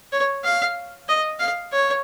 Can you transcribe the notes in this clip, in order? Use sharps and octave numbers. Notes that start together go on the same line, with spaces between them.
C#5
F5
D#5
F5
C#5